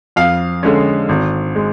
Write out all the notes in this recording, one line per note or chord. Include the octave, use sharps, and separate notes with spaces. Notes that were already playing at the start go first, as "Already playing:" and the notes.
F2 F5
D3 G#3 C#4
G#1
G#3